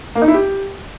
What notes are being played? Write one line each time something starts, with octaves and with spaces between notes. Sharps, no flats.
A#3
D#4
E4
G4